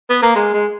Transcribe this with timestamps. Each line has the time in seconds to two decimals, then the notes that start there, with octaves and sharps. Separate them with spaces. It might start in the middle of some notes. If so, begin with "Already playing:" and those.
0.10 B3
0.23 A#3
0.35 G#3
0.54 G#3